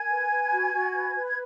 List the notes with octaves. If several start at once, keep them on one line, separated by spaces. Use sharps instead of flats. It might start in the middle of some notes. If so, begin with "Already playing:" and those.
Already playing: A#4 G#5 G#6
B4
B4
F#4
F#4
B4
B4
G#6